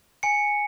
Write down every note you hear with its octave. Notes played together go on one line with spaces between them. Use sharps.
G#5 C#7